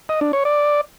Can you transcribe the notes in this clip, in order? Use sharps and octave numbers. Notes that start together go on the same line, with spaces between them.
D#5
D4
C#5
D5